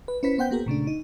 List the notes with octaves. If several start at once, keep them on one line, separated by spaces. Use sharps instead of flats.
B4
C#4 E4 B4 C5 B6
B3 C5 F#5 G5 G6
A#3 B3 F#4 G#4 A#4
A#2 C#3 A3 D4
D#4